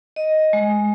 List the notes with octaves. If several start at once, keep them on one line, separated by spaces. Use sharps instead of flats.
D#5
G#3